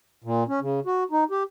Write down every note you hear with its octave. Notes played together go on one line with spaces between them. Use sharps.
A#2
C#4
C#3
F#4
D#4
G4